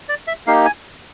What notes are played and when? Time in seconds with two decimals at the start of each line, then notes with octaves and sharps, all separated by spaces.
0.09 D5
0.27 E5
0.47 A#3 D#4 G4 F5
0.65 G#5